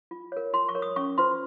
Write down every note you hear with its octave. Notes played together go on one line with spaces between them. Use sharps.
F4
A#4 C#5
F4 C6
C#6
A#4 C#5
D#6
C#4 C#6
F4 C5 C6